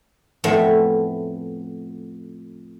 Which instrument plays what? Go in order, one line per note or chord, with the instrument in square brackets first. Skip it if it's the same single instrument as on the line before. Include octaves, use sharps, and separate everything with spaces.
[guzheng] F2 A2 B3 A4 E5